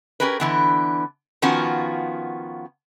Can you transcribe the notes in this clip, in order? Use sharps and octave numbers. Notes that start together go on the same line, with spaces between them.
C#4 G4 G#4 A#4 B4
D3 E3 B3
D#3 F3 B3 C#4 F4 F#4